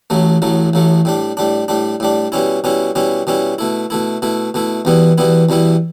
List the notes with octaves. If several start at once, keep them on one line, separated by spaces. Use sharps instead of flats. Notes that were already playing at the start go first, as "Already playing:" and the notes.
A1 A2 F#3 A3
A1 A2 F#3 A3
A1 A2 F#3 A3
A2 G3 D4
A2 G3 D4
A2 G3 D4
A2 G3 D4
B2 G3 C#4 E4
B2 G3 C#4 E4
B2 G3 C#4 E4
B2 G3 C#4 E4
B2 A3 E4
B2 A3 E4
B2 A3 E4
B2 A3 E4
E2 B2 G3 B3 E4
E2 B2 G3 B3 E4
E2 B2 G3 B3 E4